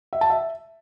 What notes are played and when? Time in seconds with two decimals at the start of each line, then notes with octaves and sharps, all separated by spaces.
0.13 E5
0.21 A5
0.30 E5